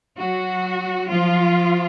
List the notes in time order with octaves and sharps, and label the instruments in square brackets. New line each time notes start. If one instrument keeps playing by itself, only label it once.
[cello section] F#3 F#4
F3 F4